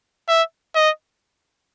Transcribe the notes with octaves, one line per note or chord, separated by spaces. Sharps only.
E5
D#5